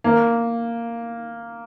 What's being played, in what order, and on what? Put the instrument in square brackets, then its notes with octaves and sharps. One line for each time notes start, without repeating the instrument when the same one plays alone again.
[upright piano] A#3